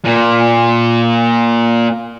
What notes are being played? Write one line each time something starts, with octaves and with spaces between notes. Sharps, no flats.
A#2